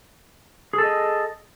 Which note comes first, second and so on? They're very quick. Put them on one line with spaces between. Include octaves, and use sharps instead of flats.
G#4 A4 D#5